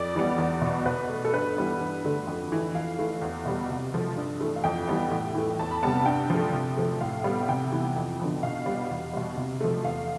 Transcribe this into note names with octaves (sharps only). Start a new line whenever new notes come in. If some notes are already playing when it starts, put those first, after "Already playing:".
Already playing: F2 D5
E3 G3 B3
E2
B2 B3
B2 B4
A3
A4
G2 B4
E3 G3 B3
G2
D3 A3
F2
E3 A3
F2 F5
E3 A3
E2
B2 G3 B3
C3
F3 A3
G2
E3 A3
F5
F2 G5
E3 G3 B3
A2
E3 A3
E2 A5
B5
C3 G3 B3 A5
G2 G5
F3 A3
C3
F3 A3
A2 F5
G3 B3
C3 G5
E3 B3
F2
D3 F3 B3
B2 F5
G3 B3
E2
B2 G3
C3
F3 A3
E2 F5